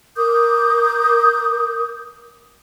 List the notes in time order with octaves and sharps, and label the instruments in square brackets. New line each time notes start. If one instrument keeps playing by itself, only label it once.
[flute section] A#4 D6 D#6 G6